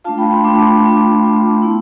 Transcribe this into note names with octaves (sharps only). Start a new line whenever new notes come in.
A3 D4 F4 F5 A5
G5 B5
A5 C6
A3 D4 F4 B5 D6
A3 D4 F4
A3 D4 F4
B3 E4